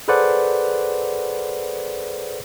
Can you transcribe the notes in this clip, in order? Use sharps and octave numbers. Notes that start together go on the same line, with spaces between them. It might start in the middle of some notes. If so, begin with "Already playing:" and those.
G#4 A4 B4 C5 D5 F#5